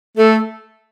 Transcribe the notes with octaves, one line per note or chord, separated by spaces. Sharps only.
A3 A4